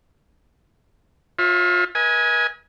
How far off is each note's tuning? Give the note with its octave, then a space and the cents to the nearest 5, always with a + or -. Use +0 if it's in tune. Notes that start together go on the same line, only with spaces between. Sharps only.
F4 +30 C#5 -40 E5 +0
B4 -40 D#5 +40 G#5 +0